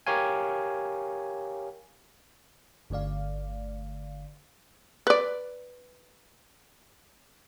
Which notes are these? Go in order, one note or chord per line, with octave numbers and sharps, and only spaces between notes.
G4 A#4 C#5 F5 G#5
G1 D3 A3 D5 F5
B4 D5